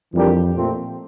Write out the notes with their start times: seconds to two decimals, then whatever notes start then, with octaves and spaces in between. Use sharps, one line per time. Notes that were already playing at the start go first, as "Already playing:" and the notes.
0.14 F2 E3 G3 D4 G4 A#4
0.56 A#2 A3 C4